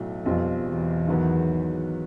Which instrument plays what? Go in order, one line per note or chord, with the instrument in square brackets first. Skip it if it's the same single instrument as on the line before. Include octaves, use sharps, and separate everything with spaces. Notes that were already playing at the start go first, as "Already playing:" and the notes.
Already playing: [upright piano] B1 A2 F#3 A3
[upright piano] B1 B2 G3 C4 F4 [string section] F2
[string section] E2
[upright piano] G#2 D#3 F#3 B3